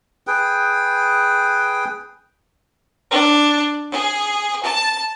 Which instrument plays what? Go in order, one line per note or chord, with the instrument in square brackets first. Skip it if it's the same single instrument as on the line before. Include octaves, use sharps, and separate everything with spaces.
[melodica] G#4 B4 G5
[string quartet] D4
G#4
A5